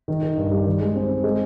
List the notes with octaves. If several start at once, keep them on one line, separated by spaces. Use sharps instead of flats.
D#3
D#3
G2
G3
D#3
G#3
C4
C4
G#3